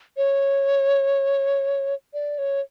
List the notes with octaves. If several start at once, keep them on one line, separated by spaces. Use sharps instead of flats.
C#5
D5
C#5